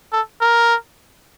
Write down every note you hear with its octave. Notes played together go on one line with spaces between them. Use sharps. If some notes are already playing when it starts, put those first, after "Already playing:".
A4
A#4